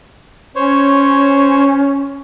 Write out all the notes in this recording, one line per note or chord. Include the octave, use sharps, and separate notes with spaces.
C#4 C5 C#5